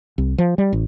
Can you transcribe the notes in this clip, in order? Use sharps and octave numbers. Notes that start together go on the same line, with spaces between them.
C2
F3
G3
A1